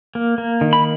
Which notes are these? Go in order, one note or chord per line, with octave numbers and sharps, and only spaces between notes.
A#3
A#3
D#3
B5